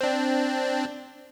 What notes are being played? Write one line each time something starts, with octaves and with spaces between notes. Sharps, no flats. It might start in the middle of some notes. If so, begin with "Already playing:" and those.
C4 D4